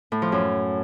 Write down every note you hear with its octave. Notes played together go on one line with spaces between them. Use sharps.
A2
F3
F#2